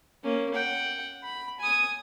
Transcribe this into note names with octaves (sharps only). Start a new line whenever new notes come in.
A#3 C#4
F#5 G5
B5
G#5 D#6